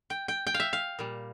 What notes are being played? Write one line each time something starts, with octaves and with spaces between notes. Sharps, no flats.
G5
G5
G5
F5
E5
F5
A#2 G3